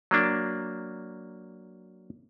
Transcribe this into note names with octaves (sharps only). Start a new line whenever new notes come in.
F#3 A#3 D4